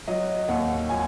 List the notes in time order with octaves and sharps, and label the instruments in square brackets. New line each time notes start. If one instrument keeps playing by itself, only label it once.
[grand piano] F#3 D#5
D#2 F#5
F#3 G#5